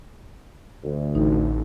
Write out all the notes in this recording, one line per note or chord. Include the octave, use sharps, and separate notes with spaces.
D2
A1 D#4